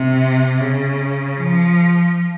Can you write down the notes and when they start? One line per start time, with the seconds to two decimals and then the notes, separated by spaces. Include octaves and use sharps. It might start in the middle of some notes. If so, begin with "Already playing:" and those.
Already playing: C3
0.60 C#3
1.38 F3